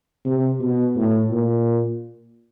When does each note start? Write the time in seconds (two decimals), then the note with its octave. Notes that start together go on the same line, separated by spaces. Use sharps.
0.25 C3
0.60 B2
0.96 A2
1.31 A#2